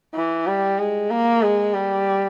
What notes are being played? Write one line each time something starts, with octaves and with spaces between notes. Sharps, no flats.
E3
G3
G#3
A#3
G#3
G3